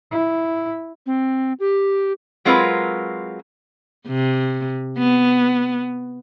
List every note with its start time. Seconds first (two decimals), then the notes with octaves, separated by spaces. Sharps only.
0.11 E4
1.06 C4
1.60 G4
2.45 F#3 G#3 C4 F4 A#4 B4
4.08 C3
4.98 B3